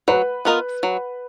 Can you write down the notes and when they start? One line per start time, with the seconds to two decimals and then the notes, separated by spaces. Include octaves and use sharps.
0.08 F#3 B4
0.45 B3 F4 A#4 D#5
0.83 F#3